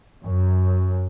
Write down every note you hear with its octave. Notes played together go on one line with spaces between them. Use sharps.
F#2